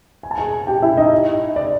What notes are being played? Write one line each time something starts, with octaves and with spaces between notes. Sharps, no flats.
G#5
A5
G#4 G#5
G4 G5
E4 E5
D#4 D#5
D5